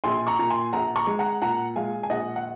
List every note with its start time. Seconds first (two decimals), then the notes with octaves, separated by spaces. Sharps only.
0.04 A#1 G#5 C6
0.27 A#5 C#6
0.39 A#2 A#5
0.50 G#5 C6
0.73 A#1 F#5 A#5
0.96 A#5 C#6
1.07 G#3
1.19 F#5 A#5
1.42 A#2 F#5 A#5
1.76 G#3 F5 G#5
2.03 G#5
2.10 A#1 D#5 F#5
2.36 F#5